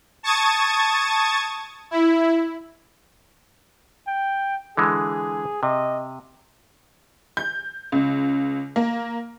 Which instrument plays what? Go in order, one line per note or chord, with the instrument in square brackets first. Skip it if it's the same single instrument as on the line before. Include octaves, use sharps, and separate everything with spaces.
[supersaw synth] A5 C#6 D#6 G#6 A6
E4
[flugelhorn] G5
[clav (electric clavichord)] D3 E3 G#3 [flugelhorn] G#4
[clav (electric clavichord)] C3 [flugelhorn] D#5
[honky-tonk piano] G6
C#2
A#3